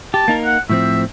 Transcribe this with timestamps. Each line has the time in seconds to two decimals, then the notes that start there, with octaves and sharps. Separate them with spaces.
0.14 G4 A5
0.28 A#3 D#4 A#4
0.45 F#5
0.70 A2 F3 C4 E5